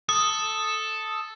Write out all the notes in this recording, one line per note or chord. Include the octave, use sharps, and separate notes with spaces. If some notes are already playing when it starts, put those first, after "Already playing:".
A4 D#6